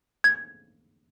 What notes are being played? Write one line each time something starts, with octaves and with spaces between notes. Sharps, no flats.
G#6